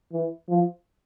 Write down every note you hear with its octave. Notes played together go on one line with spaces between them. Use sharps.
E3
F3